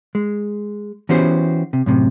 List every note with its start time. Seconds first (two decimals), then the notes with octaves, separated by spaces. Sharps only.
0.15 G#3
1.09 E3 B3 C#4 F#4 G4 C5
1.73 C3
1.86 F#2 A2 C3